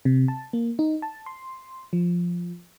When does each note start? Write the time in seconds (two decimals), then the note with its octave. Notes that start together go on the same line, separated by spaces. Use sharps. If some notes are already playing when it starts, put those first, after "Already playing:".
0.05 C3
0.28 A5
0.53 A#3
0.79 D#4
1.02 A5
1.26 C6
1.93 F3